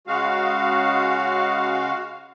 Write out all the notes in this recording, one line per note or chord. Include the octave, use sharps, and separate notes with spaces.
C#3 G#3 F#4 F5